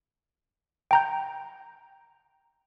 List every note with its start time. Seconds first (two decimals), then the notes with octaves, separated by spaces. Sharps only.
0.91 G5 A#5 G6